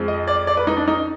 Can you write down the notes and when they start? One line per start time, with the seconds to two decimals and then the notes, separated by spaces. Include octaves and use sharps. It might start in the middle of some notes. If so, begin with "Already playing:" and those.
Already playing: F2 F3 G#3
0.08 D#5
0.27 D5
0.47 D5
0.57 B4
0.67 D#4
0.77 D4
0.88 D#4